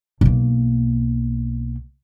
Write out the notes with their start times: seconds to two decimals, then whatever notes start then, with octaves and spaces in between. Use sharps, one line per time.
0.21 B1 A#3